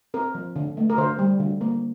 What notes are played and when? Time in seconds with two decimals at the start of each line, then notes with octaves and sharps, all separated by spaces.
0.14 C4 A#4
0.35 F3
0.56 D3
0.77 A3
0.90 A#4
0.98 D3 C5
1.19 G3
1.40 D3
1.61 A#3